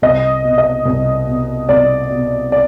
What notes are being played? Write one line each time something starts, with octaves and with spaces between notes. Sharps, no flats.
C2 D#5
B2
D#5
C2
B2
C2 D5
B2
D5